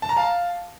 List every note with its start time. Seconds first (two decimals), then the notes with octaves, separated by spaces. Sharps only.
0.02 A5
0.09 A#5
0.16 F5 A5